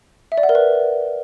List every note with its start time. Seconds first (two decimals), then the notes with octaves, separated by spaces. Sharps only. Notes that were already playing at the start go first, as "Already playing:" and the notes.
0.32 E5
0.38 D5
0.43 F#5
0.49 A#4
0.55 B4